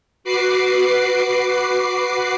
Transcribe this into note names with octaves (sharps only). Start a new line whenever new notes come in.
F#4 B4 D6 C7